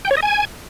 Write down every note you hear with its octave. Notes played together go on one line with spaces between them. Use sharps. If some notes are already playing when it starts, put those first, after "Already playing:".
G5
C#5
D#5
G#5